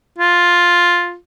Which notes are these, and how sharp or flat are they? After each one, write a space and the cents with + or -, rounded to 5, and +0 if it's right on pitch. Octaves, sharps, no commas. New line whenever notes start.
F4 +5